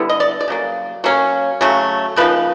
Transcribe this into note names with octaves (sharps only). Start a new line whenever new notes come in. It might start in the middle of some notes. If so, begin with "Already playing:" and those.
Already playing: D3 G3 B3 E4
D#5
D5
D5
C#3 F#3 A#3
F#3 A#3 C#4
C#3 F#3 A3
C#3 F3 A#3 D#4 B4